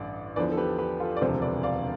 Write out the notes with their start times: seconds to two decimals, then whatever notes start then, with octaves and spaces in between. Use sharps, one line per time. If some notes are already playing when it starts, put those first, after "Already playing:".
Already playing: A1 G2 D3 D5
0.36 E2 D3 F3 B4 D5
0.52 A4
0.57 G4 B4
0.79 G4 B4
1.00 F4 A4
1.17 D5
1.21 E1 D2 C3 F3 A4 C5
1.42 B4 D5
1.63 D5 F5